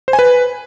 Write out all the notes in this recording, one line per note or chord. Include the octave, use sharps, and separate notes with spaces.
C5
G#5
B4